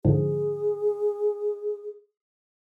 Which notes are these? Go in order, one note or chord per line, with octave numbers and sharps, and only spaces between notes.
G#2 D3 F3 G#4